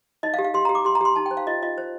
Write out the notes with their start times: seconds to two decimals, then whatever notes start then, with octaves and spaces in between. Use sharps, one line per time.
0.23 D#4 D#5
0.34 F5
0.39 G4
0.44 F5
0.54 G4 C6
0.65 A#5
0.69 G4
0.75 D6
0.85 G4 C6
0.95 A#5
1.01 G4 C6
1.16 D#4 A5
1.26 G5
1.31 C5
1.37 F5
1.47 F4 D#5
1.62 F4 D#5
1.78 C5